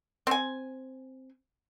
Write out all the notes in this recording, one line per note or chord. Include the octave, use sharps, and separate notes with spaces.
C4 G#5